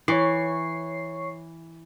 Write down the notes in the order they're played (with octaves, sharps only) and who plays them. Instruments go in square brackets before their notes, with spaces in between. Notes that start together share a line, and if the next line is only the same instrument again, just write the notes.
[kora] E3 [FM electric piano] C#5 C#6 C7